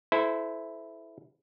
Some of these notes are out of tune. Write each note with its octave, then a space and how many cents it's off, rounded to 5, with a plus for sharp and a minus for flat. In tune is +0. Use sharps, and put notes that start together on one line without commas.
E4 +0 A4 -25 C5 -30